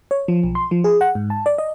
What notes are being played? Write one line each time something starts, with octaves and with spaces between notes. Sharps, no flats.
C#5
F3
B1
C6
F3
G#4
F#5
G#2
A5
D5
D#5